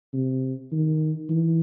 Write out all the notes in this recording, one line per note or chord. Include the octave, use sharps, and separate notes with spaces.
C3
D#3
E3